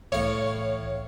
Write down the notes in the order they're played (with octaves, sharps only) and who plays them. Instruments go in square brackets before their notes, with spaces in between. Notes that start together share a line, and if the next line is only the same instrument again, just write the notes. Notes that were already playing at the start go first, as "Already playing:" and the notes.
[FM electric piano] C2 E3 A3 [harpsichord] A2 F5 [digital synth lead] C#5